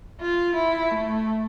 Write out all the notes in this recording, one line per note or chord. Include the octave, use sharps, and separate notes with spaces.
F4
E4
A3